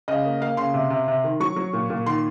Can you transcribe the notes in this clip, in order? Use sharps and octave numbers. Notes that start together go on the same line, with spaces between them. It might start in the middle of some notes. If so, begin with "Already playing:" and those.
C#3 D#5
A#3
A#3 F5
C#3 C6
C3
C3
C3
D#3
F#3 C#6
F#3
A#2
A#2
D#3 C6